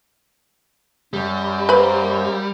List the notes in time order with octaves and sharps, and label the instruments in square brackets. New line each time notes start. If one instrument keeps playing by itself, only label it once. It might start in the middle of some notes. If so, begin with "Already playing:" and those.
[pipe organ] F#2 [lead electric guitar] G3
[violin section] A#3 C5 [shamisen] B4 B5